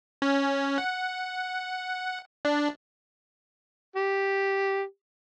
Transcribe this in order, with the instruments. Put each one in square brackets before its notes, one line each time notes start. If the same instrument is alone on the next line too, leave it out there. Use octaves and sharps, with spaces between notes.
[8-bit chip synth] C#4
F#5
D4
[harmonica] G4